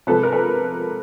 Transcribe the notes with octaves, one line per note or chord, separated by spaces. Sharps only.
C3 F3 G#3 A4 B4
A#4
A4 B4